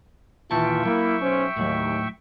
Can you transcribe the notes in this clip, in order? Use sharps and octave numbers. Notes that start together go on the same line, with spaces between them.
D#2 A#2 E3 F4 E5 G5 A5 C#6
F#3 A#3 E4
B1 C#4 C5
D#2 A2 F#3